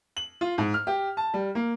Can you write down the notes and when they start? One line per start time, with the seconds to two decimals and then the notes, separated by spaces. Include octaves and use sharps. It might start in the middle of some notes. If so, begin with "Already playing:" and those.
0.17 F#7
0.41 F4
0.58 G#2
0.74 F6
0.87 G4
1.17 A5
1.34 G3
1.55 A#3